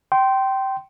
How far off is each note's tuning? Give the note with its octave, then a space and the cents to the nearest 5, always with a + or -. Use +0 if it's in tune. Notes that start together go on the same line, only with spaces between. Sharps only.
G5 -20 C6 +0